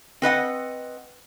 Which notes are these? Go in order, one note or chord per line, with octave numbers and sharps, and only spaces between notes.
C4 B4 D#5 F#5